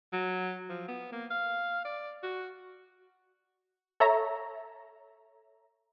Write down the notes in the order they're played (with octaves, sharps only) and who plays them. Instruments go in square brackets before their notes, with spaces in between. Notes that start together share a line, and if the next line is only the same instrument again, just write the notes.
[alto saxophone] F#3
F3
B3
A#3
F5
D5
F#4
[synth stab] A4 C#5 E5 A#5